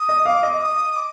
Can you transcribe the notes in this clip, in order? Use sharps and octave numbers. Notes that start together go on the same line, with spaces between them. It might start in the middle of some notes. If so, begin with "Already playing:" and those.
Already playing: D#6
D#5
F5 D6
D#5
D#6
D6